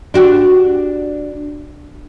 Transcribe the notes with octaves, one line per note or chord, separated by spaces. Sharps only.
D4 F#4 G4